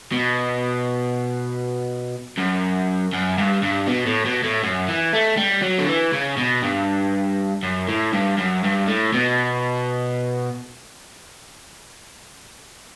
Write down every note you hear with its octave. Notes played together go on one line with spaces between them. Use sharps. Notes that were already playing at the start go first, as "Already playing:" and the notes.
B2
F#2
F#2
G2
G2
B2
A2
B2
A2
F#2
E3
A3
G3
F#3
D3
E3
C#3
B2
G2
F#2
A2
G2
F#2
G2
A2
B2